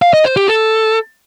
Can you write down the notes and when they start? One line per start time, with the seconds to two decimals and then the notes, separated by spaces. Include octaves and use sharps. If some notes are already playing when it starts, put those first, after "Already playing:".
0.02 F5
0.13 D#5
0.25 C5
0.37 G4
0.48 A4